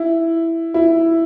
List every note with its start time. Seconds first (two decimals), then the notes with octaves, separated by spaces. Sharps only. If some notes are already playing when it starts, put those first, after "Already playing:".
Already playing: E4
0.74 E4